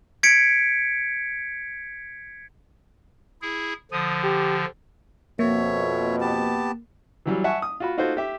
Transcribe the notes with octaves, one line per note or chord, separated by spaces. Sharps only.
G#6 B6 C#7 D7
E4 G#4
D3 F3 D#6
G4
F2 B2 A#3 C#5 E5
B3 G4 A5
E3 F#3 G3
E5 F#5 G#5 A5 C#6
D#6
F4 F#4 B5
D#4 F4 F#4 A4 C5
G4 E5